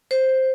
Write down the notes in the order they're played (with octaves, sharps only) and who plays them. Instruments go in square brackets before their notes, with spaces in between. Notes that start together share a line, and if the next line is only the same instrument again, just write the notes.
[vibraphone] C5